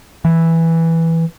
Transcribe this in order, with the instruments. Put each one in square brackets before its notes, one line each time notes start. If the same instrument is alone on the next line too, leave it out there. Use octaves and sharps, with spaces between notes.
[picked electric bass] E3